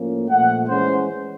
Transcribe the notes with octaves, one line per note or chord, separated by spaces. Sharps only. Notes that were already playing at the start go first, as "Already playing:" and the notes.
Already playing: A2 F3 A#3 C#4
A#2 F3 A3 F#5
E3 G#3 C#4 C5